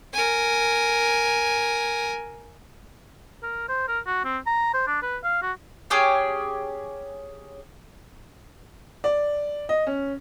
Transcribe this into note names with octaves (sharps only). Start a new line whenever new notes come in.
A#4 G#5
A#4
C5
A#4
F#4
C4
A#5
C5
D4
B4
F5
F#4
C#4 G4 G#4 C#5
D5
D#5
C#4